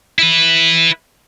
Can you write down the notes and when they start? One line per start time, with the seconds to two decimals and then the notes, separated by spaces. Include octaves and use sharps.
0.19 E4 B4